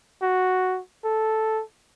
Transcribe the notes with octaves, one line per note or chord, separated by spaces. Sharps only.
F#4
A4